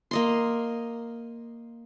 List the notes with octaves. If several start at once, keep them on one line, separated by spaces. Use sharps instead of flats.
A#3 D#5 C6